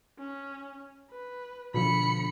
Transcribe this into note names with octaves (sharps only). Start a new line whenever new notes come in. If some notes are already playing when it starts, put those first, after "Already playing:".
C#4
B4
B2 D3 F3 B5 C#7